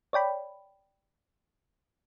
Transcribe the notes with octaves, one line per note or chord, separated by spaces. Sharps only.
C#5 D5 G5 B5